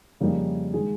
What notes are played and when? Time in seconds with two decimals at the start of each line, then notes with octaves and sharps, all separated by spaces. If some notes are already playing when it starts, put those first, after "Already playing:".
0.20 F2 C#3 G3 A#3 D#4
0.74 D#3 G#3 D#4 G#4